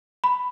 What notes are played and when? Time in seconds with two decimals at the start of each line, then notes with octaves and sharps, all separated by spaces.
0.24 B5